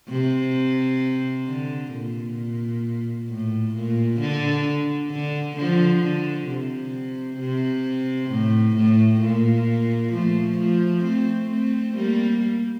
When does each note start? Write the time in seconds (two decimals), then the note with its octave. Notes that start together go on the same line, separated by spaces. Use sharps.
0.09 C3
1.47 D3
1.92 A#2
3.30 A2
3.74 A#2
4.20 D3
5.11 D3
5.57 D3 F3
6.03 D3
6.48 C3
7.40 C3
8.31 A2
8.77 A2
9.21 A#2
10.13 F3 A3
10.59 F3 A3
11.04 A3 C4
11.50 A3 C4
11.96 G3 A#3